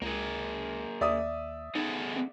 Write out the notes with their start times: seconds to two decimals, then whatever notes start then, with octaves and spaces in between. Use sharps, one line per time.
0.02 C#2 A#3 G#4
1.01 D#2 D5 E5 D#6
1.75 B3 D#4 G#4 A4
2.16 C4